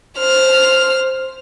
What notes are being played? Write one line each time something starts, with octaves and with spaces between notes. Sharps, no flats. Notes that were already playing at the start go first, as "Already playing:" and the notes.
C5 F6